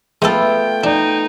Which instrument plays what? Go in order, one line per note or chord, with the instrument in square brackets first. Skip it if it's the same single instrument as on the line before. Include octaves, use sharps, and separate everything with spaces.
[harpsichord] G#3 A4 [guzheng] A3 B3 F4 [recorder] G5
[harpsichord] D4 [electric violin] D#4